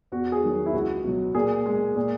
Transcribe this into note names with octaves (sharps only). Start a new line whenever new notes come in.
E2 F#4
G#4
D#3 F#3
E4
C#2 F#4
B2 F#3
A#2 G#4
G#3
A#2